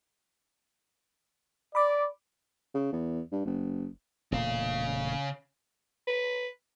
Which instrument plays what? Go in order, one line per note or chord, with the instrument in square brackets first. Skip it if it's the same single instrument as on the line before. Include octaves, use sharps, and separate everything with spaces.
[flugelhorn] D5 [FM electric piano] B5 D6
[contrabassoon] C#3
E2
G2
F#1
[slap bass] E1 A#2 A3 [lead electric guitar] C#3 F5
[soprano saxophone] B4